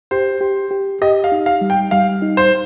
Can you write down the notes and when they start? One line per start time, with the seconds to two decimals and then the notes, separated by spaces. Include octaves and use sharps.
0.11 G4 C5
0.41 G4
0.71 G4
1.02 G4 D#5
1.24 F5
1.32 D#4
1.46 F5
1.61 G3
1.70 G5
1.91 G3 F5
2.22 D#4
2.37 C5